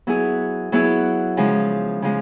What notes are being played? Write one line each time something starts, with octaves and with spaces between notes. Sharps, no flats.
F#3 B3 E4 G#4
F#3 B3 E4 G#4
C#3 F3 G#3
C#3 F3 G#3